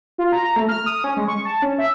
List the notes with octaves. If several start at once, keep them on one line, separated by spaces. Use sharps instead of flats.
F4
A#5
A#5
A3
F6
D#6
C#4
G#3
C#6
A5
C#4
E5